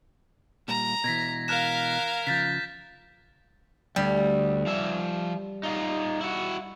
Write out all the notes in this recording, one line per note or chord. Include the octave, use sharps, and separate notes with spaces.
A#2 G3 A#5
B2 E3 G#6 A#6 B6
A#4 F5 F6 F#6 E7
C#3 F3 G6 A6 B6
D2 G3
F3 E5
D#4 F4
E4 F#4